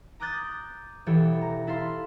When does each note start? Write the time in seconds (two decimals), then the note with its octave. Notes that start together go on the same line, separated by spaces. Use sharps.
0.20 A#5 D6 D#6 F#6 G6 A6
1.06 E1 E3 G4 A4 C#5
1.41 A#5
1.67 E4 A4 F5 C6